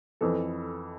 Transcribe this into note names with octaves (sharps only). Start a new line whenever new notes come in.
F2 E3 A4